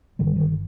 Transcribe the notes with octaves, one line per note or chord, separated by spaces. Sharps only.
G1 G2 D3 D#3 G3
D#3